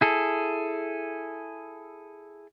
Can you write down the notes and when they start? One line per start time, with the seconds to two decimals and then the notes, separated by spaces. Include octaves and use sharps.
0.01 E4 G#4 A4